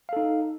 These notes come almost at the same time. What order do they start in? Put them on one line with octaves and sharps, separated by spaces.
F5 A4 D#4